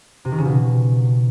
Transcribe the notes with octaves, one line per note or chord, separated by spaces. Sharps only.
C3
D#3
C#3
B2